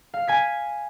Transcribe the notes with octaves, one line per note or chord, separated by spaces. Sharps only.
F5
G#5 G#6 B6